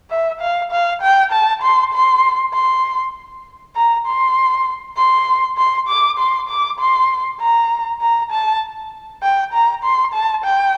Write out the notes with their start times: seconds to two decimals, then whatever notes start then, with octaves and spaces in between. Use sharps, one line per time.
0.10 E5
0.41 F5
0.71 F5
1.02 G5
1.32 A5
1.62 C6
1.93 C6
2.54 C6
3.76 A#5
4.06 C6
4.97 C6
5.58 C6
5.88 D6
6.19 C6
6.49 D6
6.80 C6
7.40 A#5
8.01 A#5
8.31 A5
9.23 G5
9.53 A#5
9.84 C6
10.14 A5
10.45 G5